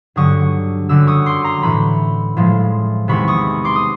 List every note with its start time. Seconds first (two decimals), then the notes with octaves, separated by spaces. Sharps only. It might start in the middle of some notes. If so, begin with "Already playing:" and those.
0.16 G2 D3 F#3 C#6 D#6
0.89 F#2 D3 G3 D6 E6
1.07 C#6 D#6
1.26 C6 D6
1.44 A#5 C6
1.60 A2 E3 G3 B5 C#6
2.37 A2 F3 G#3
3.08 E2 C3 D#3 G#3 B5 C#6
3.28 C#6 D#6
3.64 C6 D6
3.75 D#6